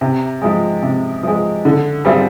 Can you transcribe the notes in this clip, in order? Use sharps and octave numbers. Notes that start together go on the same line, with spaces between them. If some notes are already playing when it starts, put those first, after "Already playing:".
C3
F3 G#3
C3
F3 G#3
D3
G3 C4 F4 G#4